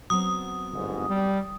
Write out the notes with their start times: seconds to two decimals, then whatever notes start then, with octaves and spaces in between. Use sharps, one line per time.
0.10 F#3 B3 C4 D#6
0.73 G1 G#2
1.08 G3